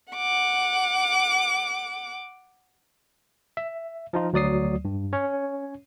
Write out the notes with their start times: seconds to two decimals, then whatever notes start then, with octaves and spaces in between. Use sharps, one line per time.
0.13 F#5 D6
3.57 E5
4.13 F3 D#4 F4
4.33 D2 F#3 D5 D#6 C7
4.85 G2
5.13 C#4 C#5